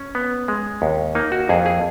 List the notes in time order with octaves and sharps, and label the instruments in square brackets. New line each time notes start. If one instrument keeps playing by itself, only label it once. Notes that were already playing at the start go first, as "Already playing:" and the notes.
Already playing: [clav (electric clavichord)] C#4
B3
G#3
D#2
A#3 D#4
F#4
F2 G#4
G#4